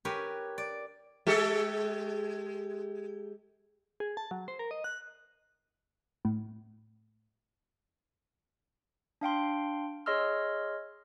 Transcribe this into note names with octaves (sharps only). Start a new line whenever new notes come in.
G4 A#4 B4 C#5 G#5
D5
G#3 G4 A4
G#4
A5
F#3
C5
A#4
D#5
F#6
A2
D4 F5 G5 C6
G#4 C#5 D#5 C6 E6 F6